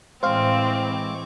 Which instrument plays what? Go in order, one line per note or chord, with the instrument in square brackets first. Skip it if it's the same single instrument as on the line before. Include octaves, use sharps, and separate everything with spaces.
[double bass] A2 E3 [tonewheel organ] G#3 C#6 D6 [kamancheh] C4 [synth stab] C5 F5